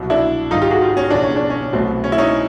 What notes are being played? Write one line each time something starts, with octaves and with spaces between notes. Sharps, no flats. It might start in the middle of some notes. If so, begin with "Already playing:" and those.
Already playing: C2 B2 F#3
D4 E4
G#1 G2 D#3 D#4 F4
F4 G4
F#4 G#4
F4 G4
C#4
E1 E2 C#3 F3 D4
C#4
D4
C#4
C2 B2 F#3 A3 C4
C#4
E4
C#4 D#4